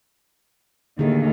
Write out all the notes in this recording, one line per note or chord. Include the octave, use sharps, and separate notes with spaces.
D#2 A2 D3 D#3 G#4